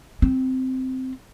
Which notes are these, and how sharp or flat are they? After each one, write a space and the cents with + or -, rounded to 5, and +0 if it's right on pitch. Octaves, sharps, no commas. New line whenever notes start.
C4 -10